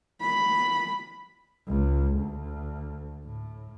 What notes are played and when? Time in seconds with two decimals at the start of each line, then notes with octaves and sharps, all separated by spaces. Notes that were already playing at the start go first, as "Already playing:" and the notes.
0.21 B5
1.67 C#2
2.16 D2
3.25 A2